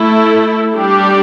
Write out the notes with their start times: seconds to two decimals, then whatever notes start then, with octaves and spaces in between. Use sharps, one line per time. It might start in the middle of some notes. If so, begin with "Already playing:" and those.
Already playing: A3 E4 A4
0.75 G3 D4 G4